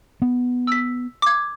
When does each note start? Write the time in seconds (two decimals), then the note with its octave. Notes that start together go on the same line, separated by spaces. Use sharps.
0.22 B3
0.67 E6 B6
1.22 D6 G#6